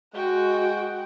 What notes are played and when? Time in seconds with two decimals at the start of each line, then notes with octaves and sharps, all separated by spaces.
0.15 G#3 F#4 F#5 G5